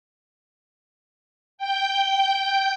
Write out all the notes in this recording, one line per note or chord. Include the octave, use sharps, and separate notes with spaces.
G5 G6